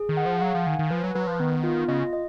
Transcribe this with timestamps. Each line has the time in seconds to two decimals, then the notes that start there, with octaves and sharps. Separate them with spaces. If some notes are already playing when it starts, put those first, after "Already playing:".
Already playing: G#4
0.09 D#3
0.17 F#5
0.26 F3
0.41 F#3 F5
0.55 F3
0.67 D#3 G#5
0.79 D#3
0.91 F3 B4
1.04 F#3
1.15 F#3 B4
1.27 F3
1.40 D#3 B3
1.63 F4
1.88 C#3 D#5
2.13 D#5